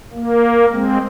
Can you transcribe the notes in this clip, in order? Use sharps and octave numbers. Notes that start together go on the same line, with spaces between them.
A#3
G#3 C4